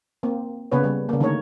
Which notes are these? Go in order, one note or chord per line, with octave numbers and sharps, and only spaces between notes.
A#3 C4
C#3 A#3 B3 B4 C#5
C#3 G3
C#3 A#3
D3 D#3 A3 A#3 A#4 C#5